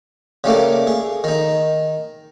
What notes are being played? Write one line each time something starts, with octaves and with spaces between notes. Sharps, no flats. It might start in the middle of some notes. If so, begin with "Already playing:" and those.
C#3 G3 A3 A#3
G#4
D#3 D#4